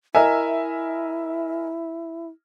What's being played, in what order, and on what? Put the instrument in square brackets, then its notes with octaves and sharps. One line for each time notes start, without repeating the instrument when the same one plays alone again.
[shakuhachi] E4 [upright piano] A#4 D#5 G#5 [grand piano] E5